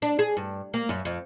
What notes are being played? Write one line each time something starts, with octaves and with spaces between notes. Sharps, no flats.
D4
G#4
G2
A#3
F#2
F2